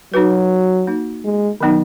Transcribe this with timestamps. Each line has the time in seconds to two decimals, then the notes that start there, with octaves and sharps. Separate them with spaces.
0.13 F#3 D#4 F#4 B4
0.87 A#3 D#4 F#4
1.25 G#3
1.61 D#3 F#3 B3 D#4